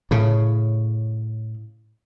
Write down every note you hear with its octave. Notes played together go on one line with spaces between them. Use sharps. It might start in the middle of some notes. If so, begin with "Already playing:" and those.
A2 C#3